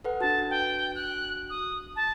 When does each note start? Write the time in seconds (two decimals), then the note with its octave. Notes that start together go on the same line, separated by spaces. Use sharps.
0.04 A4 B4 F#5
0.21 D4 F#4 A5
0.50 G5
0.95 F#6
1.50 D#6
1.96 A5